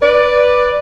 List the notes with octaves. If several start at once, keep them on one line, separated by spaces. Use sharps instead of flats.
B4 D5